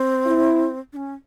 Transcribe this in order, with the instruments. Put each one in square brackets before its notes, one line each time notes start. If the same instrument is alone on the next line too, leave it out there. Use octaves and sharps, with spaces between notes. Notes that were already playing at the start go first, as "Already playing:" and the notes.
Already playing: [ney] C4
[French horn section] E4
[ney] D4
C#4